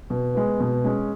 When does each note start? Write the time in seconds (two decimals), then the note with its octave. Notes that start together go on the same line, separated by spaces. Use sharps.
0.10 B2
0.35 G#3 B3
0.60 B2
0.84 G#3 C#4